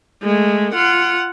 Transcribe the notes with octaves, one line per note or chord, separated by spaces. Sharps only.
G#3 A3
F4 F#5